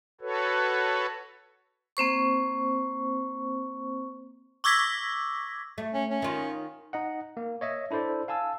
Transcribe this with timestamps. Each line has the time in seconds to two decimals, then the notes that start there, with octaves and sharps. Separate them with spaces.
0.21 F#4 A4 B4 C#5
1.97 A#3 C4 C5 C#6
4.64 C#6 D6 E6 G#6 A#6 B6
5.78 A3
5.94 C#4
6.11 C#4
6.22 D#3 F4
6.93 D#4 D#5 F#5
7.37 A#3
7.61 C#5 D#5 E5
7.91 D4 E4 A4 C5 D5
8.28 F5 G#5 A5 E6